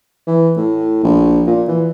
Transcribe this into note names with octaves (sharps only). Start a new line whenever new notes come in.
E3
A2
A#1
A#2
E3